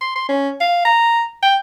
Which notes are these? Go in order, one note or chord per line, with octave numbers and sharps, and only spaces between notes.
C6
C6
C#4
F5
A#5
G5